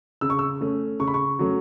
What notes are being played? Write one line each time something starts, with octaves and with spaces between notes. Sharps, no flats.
C#3 E6
C#6
E6
A3 C#4
C#3 C#6
B5
C#6
F#3 A3 C#4